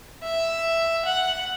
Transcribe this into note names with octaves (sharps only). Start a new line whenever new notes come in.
E5
F#5